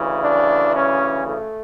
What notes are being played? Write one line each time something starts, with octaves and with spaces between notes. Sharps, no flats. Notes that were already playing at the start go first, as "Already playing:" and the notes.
Already playing: D2 C#3 E3
D4
C#4
A3